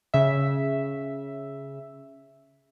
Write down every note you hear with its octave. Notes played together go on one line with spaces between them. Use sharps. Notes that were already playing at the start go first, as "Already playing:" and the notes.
C#3 E5